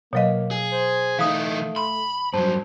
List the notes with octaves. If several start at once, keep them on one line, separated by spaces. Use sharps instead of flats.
B2 F#3 A#3 C#5 D#5 F5
G#4
C5
E3 A3 D#4 F5 D#6
B5 C6
G2 F#3 C5 A5